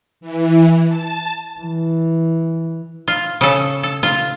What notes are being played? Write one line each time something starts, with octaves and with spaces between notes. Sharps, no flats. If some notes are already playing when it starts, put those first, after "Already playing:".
E3
A5
E3
F4
C#3 A4
A4
F4